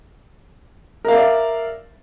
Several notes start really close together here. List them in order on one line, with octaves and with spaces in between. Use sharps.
A#4 F5 E5 D5